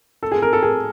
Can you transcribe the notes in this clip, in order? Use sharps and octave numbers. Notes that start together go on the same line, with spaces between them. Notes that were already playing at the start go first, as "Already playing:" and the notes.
A4
G#4
A#4
A4
G#4